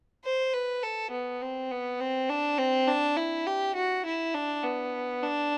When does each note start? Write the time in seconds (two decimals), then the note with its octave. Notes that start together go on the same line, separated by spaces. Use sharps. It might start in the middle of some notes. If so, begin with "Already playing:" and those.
0.24 C5
0.53 B4
0.82 A4
1.11 B3
1.41 C4
1.71 B3
2.00 C4
2.29 D4
2.58 C4
2.88 D4
3.17 E4
3.47 G4
3.75 F#4
4.05 E4
4.34 D4
4.63 B3
5.23 D4